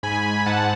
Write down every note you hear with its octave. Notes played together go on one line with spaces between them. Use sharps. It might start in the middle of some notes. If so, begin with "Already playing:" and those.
G#2 G#5 B5
G#2 F#5 A5